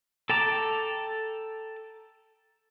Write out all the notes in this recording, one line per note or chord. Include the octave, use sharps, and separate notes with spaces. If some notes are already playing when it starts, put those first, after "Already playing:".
A4 G5 A5 A#5 D6